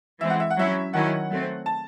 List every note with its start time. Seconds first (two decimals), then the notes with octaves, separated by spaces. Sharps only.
0.20 E3 G#3 C4 E5
0.30 F#5
0.40 E5
0.50 F#5
0.57 F#3 C#4 E4 E5
0.93 D#3 F#3 C#4 E4 F#5
1.30 F#3 A3 C4
1.66 A5